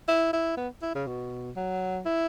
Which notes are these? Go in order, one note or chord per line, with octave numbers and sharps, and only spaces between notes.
E4
E4
B3
E4
C#3
B2
F#3
E4